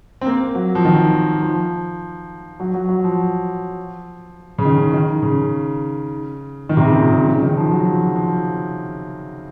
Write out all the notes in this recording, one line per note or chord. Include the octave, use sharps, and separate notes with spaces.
C4
A#3
F#3
F3
D#3
F3
F#3
F#3
F#3
F3
C#3
D#3
D#3
C#3
D#3
C3
C#3
A#2
C#3
C#3
D#3
F3
F#3
F3
F3